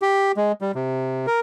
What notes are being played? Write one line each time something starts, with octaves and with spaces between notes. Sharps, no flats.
G4
G#3
G3
C3
A#4